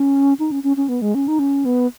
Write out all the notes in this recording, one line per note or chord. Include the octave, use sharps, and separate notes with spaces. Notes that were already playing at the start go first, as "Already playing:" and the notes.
Already playing: C#4
D#4
C#4
C#4
C#4
B3
G#3
C#4
D#4
C#4
B3